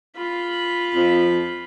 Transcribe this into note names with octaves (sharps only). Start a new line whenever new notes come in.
F4 B5
F2 F3